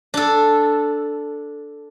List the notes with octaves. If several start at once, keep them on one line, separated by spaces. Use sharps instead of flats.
D4 A4